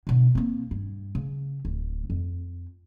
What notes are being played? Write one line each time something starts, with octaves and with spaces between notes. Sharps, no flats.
B2 D3
A#3 C4
G2
C#3
D1
F2